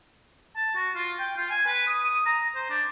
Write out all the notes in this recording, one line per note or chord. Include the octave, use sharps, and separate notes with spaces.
A5
F#4
F4
G5
F4
G#5
B4
D#6
D#6
A#5
C5
D4